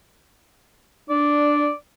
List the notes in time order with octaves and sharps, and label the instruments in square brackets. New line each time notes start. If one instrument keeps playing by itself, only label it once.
[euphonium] D4 [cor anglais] D5